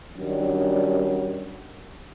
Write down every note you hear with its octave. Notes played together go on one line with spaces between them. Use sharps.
D#3 F#3 G3 C#4 D4